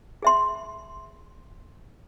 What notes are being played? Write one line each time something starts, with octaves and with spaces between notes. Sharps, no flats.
G#4 E5 C6